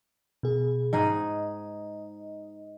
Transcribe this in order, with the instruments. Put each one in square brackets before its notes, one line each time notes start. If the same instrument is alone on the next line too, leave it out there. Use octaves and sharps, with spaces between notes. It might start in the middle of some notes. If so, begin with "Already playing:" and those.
[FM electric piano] B2 G#4
[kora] G#2 D#4 G#4 [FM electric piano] D#5